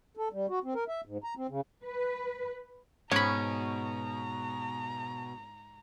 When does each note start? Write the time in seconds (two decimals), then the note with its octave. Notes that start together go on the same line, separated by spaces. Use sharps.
0.17 A4
0.33 G3
0.49 F#4
0.64 C4
0.75 A#4
0.88 E5
1.05 G#2
1.24 A#5
1.37 C4
1.49 C#3
1.84 B4
3.11 G#2 B2 C#4 A#5 B5